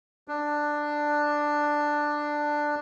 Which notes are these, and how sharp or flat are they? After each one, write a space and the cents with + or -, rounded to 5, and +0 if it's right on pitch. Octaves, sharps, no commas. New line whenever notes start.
D4 +10